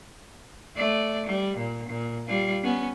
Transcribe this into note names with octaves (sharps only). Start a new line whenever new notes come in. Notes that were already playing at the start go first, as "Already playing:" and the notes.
A3 D5
G3
A#2
A#2
G3 F4
B3 C#4